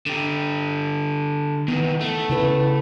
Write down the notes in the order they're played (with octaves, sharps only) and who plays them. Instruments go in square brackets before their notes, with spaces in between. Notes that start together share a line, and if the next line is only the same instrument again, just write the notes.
[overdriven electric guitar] D3 G4
[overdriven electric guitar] D#3 E3 [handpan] B3
[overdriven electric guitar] A3
[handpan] C#3 E4 B4